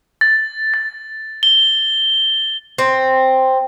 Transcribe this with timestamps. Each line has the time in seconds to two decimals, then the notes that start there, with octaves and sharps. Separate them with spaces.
0.21 A6
0.74 A6
1.43 G7
2.78 C4